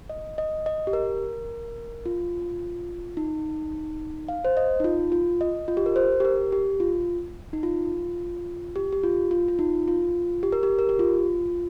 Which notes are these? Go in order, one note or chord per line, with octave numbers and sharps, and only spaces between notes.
D#5
D#5
D#5
G4
A#4
F4
D#4
F5
C5
D#5
D#4
F4
F4
D#5
F4
G4
A#4
C5
G4
A#4
G4
F4
D#4
F4
G4
G4
F4
F4
F4
D#4
F4
G4
A#4
G4
A#4
G4
F4